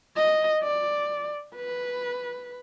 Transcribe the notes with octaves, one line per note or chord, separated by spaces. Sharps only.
D#5
D5
B4